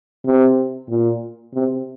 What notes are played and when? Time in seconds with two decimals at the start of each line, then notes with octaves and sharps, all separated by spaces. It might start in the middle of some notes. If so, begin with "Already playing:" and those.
0.25 C3
0.89 A#2
1.54 C3